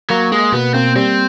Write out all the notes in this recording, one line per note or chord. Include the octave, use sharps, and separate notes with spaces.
F#3 A#3
G#3 A#3
B2 B3
A#3 C4
G3 C4